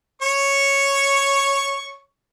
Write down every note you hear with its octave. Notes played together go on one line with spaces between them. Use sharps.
C#5 C#6